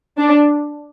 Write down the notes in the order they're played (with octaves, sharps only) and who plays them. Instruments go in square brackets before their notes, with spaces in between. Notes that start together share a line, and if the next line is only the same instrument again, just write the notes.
[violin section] D4